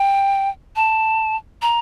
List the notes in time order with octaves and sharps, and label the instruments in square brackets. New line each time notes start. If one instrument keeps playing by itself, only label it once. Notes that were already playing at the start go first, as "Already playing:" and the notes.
Already playing: [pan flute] G5
A5
A#5